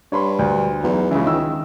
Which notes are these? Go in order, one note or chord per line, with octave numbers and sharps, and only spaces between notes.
G2 C#5 B5 C6
D2
B1 E2
C#2 C#3 E3
D#3 E6